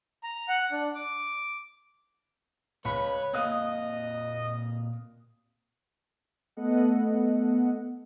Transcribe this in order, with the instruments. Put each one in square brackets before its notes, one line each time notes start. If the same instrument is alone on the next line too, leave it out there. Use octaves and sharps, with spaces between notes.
[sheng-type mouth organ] A#5
F#5
D4
D6
[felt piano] C#2 B5 [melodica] B4 [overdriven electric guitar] C#5
[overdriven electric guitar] A#2 C4 [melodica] D#5 [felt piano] F5 D#6 F#6
[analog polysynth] A3 B3 A4 D#5 F#5